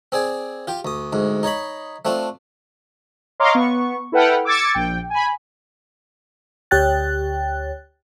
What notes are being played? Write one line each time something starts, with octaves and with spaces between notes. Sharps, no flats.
C4 G#4 D5 G#5
F4 G4 G5
D2 D#6
D2 G#2
D#4 C#5 D#5 B5
A3 C4 D4 F4
C#5 D#5 F5 A#5 C6 D6
B3 C#6
E4 A4 B4 F#5 G5 F6
D6 E6 G#6 A6 C#7
A#1 G5
G#5 B5
D2 G4 C#5 G5 F#6 A6